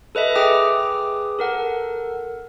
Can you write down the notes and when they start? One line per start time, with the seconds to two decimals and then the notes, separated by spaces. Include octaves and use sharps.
0.15 A4 B4 D#5 E5
0.35 G#4 B4 G5 D6 D#6
1.39 A4 A#4 F#5